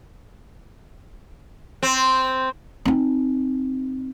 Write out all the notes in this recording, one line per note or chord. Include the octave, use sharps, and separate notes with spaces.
C4
C4 D#4